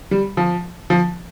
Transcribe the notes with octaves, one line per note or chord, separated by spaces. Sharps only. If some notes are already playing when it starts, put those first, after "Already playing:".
G3
F3
F3